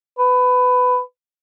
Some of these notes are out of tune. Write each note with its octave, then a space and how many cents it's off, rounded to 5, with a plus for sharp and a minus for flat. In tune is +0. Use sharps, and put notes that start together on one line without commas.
B4 +20